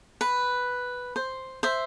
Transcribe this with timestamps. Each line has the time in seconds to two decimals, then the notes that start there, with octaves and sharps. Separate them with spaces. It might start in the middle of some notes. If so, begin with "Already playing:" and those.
0.21 B4
1.16 C5
1.63 C5 E5